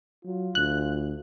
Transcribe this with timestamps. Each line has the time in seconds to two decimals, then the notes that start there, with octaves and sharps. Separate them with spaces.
0.25 F#3 F4
0.55 D2 F#6